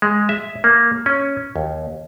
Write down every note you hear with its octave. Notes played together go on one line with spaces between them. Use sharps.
G#3
E5
A#3
C#4
D#2